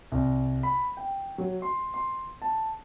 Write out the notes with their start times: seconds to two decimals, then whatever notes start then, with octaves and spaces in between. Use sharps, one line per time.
0.12 C2
0.63 B5
0.97 G5
1.38 F#3
1.62 C6
1.94 C6
2.42 A5